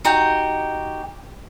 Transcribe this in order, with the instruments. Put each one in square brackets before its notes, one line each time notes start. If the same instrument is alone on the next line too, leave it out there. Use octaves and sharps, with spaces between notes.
[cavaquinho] D#4 F#4 G4 G5